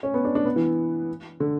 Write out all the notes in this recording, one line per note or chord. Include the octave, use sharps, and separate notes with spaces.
C#4
B3
D4
D4
B3
E3
D3